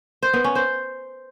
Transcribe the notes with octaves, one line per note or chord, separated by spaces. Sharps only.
C5
B3
C#4
C5